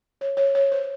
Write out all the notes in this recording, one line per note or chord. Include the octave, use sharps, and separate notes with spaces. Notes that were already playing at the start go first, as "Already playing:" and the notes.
C#5
C#5
C#5
C5